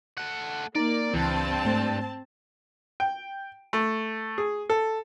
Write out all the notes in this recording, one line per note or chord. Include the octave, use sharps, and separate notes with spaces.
A3 F#5
A#3 D#4 D5 A#5
C#2 G2 E3 C4 A5
G#2 A3 C5
G5
A3
G#4
A4